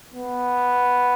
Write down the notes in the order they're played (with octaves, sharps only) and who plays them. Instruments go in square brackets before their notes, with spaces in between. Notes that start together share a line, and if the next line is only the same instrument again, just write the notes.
[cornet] B3